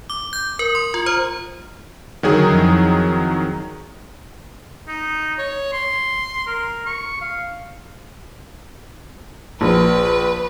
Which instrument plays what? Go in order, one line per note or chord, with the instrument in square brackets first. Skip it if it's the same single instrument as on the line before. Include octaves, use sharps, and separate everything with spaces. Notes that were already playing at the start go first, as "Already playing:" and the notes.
[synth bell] D6
G6
A#4
C6
F4
C5
[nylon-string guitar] D3 A#4 G5 [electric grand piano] D#3 F#3 G#4
[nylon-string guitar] F2 E4
[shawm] D#4
C#5
C6
A#4
C#6
F5
[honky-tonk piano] A#1 [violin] B4